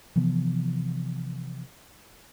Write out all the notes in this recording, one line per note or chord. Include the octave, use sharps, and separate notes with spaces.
C3 E3 F3 B3